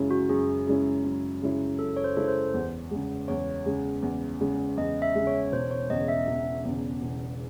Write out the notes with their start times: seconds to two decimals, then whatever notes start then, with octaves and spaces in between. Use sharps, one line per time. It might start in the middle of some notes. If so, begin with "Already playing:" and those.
Already playing: F#2 C#3 G#3 C#4 E4
0.11 F#4
0.29 F#2 G#4
0.67 C#3 G#3 C#4 E4
1.04 F#2
1.42 C#3 G#3 C#4 E4
1.79 F#2 A4
1.97 C#5
2.04 C5
2.16 C#3 G#3 C#4 E4 A4
2.28 C5
2.54 E2
2.91 C#3 G#3
3.28 E2 C#5
3.66 C#3 G#3
4.02 E2
4.40 C#3 G#3
4.77 E2 D#5
5.02 E5
5.15 C#3 G#3
5.27 C#5
5.52 E1 C5
5.71 C#5
5.90 E2 D#5
5.94 C#3
6.08 E5
6.27 E1
6.65 E2 C#3
7.02 E1